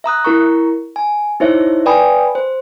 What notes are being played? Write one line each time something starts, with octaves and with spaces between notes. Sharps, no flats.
E5 A#5 D#6 F#6
E4 A#4 A#5 C#6
G#5
D#4 E4 C5 C#5 E5
B4 D5 G5 G#5 B5 D#6
C5